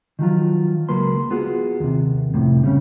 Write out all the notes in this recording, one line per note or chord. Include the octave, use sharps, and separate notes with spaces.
D#3 F3 F#3 F4
C#2 F#3 A#3 B4 C6
B3 F4 F#4 G#4
D#2 C3
C2 F2 A2 C3
C#3 G3 C#4